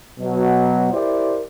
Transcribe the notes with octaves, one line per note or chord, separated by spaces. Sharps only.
B2 F#3
E4 G4 A#4 C5 D5